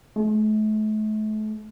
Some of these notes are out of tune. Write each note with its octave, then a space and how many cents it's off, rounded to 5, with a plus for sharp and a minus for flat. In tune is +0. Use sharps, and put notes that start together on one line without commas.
A3 -40